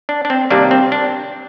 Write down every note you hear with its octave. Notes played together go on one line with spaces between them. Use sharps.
D4
D4
C4
C3 D#3 G3 A#3 D4
C4
D4